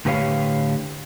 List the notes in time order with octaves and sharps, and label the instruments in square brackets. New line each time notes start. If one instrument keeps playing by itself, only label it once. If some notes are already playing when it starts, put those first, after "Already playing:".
[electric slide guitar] A2 D3 G4 B4 C#5 F5